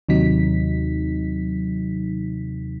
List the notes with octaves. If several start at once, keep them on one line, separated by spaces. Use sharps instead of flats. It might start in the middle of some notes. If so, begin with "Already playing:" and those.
D#2 C3 F#3 D#4 B6